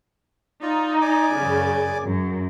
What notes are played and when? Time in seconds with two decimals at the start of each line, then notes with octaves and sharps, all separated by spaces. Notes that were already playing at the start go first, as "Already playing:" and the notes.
0.62 D#4 F4 D5
1.01 D5 G#5 D6
1.37 F#2 C#3
2.05 F#2